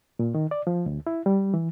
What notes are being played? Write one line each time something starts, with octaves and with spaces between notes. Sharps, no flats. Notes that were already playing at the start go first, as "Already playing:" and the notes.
A#2
D#3
D5
F3
D2
E4
G3
E3